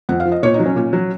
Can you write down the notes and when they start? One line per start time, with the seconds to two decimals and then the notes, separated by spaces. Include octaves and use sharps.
0.09 F2 F#5
0.20 F5
0.25 F3
0.32 D#5
0.43 A#2 C#5
0.54 D#4
0.59 F#3
0.66 C#4
0.76 A#2
0.93 F#3